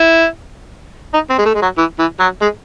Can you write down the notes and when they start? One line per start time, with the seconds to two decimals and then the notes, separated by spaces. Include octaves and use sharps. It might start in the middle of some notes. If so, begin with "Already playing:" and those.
Already playing: E4
1.14 D#4
1.30 C4
1.38 G#3
1.45 A3
1.54 G#3
1.62 F#3
1.78 E3
1.99 E3
2.20 F#3
2.41 G#3